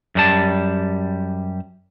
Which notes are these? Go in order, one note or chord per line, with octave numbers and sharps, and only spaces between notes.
F#2 G3 A5